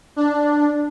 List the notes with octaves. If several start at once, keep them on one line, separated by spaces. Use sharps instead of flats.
D4